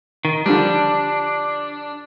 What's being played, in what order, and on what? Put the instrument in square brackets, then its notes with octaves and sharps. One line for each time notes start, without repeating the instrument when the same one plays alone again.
[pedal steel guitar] D#3
[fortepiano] D3 F3 G3 [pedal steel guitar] D4